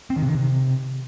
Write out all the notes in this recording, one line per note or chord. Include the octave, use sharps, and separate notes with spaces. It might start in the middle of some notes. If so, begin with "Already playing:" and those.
C4
D#3
C3
D#3
C3